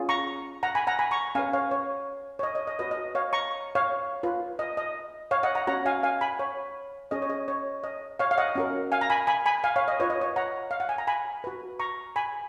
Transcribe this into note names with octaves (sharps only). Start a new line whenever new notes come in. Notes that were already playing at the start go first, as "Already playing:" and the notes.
Already playing: C#4 F4 G#4
A#5 C#6
F#5 A#5
G#5 B5
F#5 A#5
G#5 B5
A#5 C#6
C#4 G#4 B4 F5 G#5
C#5 F5
C#5
C#5
D#5
D#5
D#5
F#4 B4 D#5
D#5
C#5 F5
A#5 C#6
C#5 F5
F4 B4
D#5
D#5
C#5 F5
D#5 F#5
F#5 A#5
C#4 F#4 C#5 F#5 A#5
F5 G#5
F5 G#5
G#5 B5
C#5
C#4 G#4 C#5 D#5
C#5
D#5
C#5
D#5
C#5 F5
F5
D#5 F#5
C#4 F#4 A#4
F5 G#5
A#5
G#5 B5
G#5 B5
G#5 B5
F5 G#5
C#5 F5
D#5
F4 B4 C#5
D#5
C#5
F#5 A#5
F5
F#5
G#5
A#5
G#5 B5
F#4 B4
A#5 C#6
G#5 B5